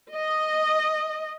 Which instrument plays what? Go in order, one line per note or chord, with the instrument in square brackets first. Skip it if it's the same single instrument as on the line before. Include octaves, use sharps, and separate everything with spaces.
[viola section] D#5